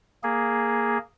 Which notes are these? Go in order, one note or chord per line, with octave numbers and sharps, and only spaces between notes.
A#3 G#4